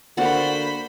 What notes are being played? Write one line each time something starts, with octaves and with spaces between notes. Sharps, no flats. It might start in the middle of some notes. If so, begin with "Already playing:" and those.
D3 A#3 F#4 C5 D5 F#5 B5